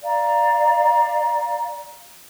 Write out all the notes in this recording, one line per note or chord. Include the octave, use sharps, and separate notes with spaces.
D5 F5 A#5